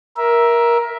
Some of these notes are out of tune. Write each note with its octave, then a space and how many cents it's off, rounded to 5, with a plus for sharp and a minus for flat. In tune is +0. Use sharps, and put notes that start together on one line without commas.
A#4 +15 E5 +0